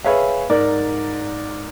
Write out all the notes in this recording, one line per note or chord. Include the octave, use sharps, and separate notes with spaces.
G#4 B4 C#5 E5 F5
G#2 A#4 D5